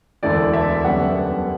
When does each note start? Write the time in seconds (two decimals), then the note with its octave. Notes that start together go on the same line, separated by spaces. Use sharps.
0.23 E1 D2 D3 A3 E4 D5
0.53 E5
0.84 F#2 D3 G3 B3 F#5